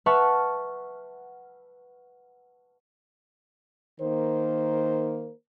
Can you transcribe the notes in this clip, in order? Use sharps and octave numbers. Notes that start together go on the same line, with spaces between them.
B4 E5 F#5 A5 C#6 F6
D#3 A#3 A#4 C5